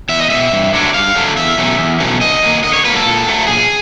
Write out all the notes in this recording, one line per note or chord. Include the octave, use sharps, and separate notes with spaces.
E2 E5
D#5
B2 G#3 E5
G2
D3 F#3 A3 D4
G2 F5
D3 F#3 A3 D4
E2 E5
B2 F#3 A3 C#4
E2
B2 F#3 A3 C#4
D3 D#5
F#3 A#3
D3 D#5
C#5
F#3 A#3 B4
A4
A#2
F#3 A3
A#2 G#4